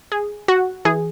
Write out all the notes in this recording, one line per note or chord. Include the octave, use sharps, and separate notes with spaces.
G#4
F#4
E3 G#4